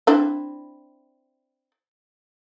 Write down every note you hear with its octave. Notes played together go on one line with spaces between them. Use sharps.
C4 D4 E4